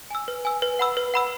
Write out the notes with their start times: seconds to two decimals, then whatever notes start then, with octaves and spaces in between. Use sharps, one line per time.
0.10 G#5 E6
0.28 B4
0.45 G#5 E6
0.62 B4
0.79 F#5 B5 E6
0.97 B4
1.14 F#5 B5 E6